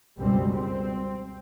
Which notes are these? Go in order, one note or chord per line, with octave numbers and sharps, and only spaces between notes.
C#2 F#2 B2 G3 C4
C4